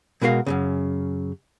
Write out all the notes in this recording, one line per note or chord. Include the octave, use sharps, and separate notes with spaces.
B2 G#3 F#4 A#4 B4 F5
F#2 A#2 C#3